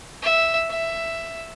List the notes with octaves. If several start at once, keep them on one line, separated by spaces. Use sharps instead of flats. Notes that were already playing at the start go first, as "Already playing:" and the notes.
E5
E5